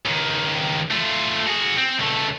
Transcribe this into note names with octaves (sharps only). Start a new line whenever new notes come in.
C#2 D#3
A3 F4
F#4 G#4
C4
C#2 A3